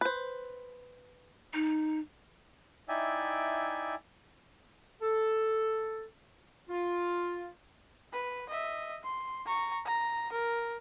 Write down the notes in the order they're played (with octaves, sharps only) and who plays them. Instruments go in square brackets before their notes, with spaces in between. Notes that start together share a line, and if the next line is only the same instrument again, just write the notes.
[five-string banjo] B4 C5
[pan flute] D#4
[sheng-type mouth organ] D#4 E4 D5 E5 G5 G#5
[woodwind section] A4
F4
[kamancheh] B4
D#5 E5
C6
A#5 C#6
A#5
A#4